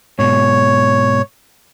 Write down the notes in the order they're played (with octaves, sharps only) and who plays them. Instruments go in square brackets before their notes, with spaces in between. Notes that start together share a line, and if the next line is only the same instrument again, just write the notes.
[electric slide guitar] G#2 B2 [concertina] C#5